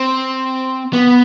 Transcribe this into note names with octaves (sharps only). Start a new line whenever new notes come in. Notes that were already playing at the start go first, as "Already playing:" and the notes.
Already playing: C4
B3